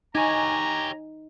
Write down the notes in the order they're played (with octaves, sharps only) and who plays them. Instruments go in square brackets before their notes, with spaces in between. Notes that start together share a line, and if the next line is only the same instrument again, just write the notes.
[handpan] D#4 [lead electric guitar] G4 C#5 [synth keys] G#5 [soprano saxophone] A#5